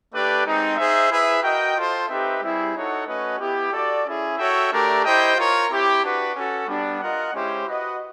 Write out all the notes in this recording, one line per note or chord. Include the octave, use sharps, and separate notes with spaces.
A3 D4 G4 B4 D5
G#3 C4 D#4
D#4 G#4 C5 E5
E4 G#4 B4 E5
F#4 A#4 D#5 G5
F4 A4 C5
C4 D#4 G4 B4 E5
G3 C4 E4 G#4
D#4 F#4 A4 C#5 F#5
A3 C#4 F#4 B4 D#5
B3 E4 G4
F#4 A4 D5
C#4 E4 G#4
F#4 A4 C#5 E5 G5
A3 D4 G4 A#4 D5
E4 G4 C5 D#5 G5
F4 A#4 C#5
C4 E4 G4
D4 F#4 B4
C#4 F#4 A4
G3 B3 D4
F4 A#4 D#5 F#5
G#3 C#4 E4 G4 C5
F#4 B4 D#5 F#5